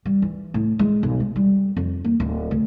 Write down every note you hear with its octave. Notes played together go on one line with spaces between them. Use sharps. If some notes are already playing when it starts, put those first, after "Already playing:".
G3
E3
A2
G#3
B1
G#3
G3
F2
A#3
D1
D2